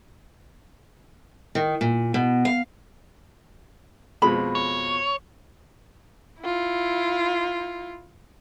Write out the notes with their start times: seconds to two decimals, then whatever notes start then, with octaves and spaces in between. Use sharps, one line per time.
1.55 D#3
1.81 A#2
2.14 B2
2.45 F5
4.22 F2 B2 G#3 B5
4.55 C#5
6.41 E4 F4